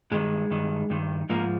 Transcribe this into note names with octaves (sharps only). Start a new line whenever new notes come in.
G2 D#3 G#3
G2 D#3
G2 D#3
G#2 F3 A#3